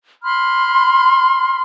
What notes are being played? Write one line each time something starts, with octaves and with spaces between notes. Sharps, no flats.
B5 C6 F6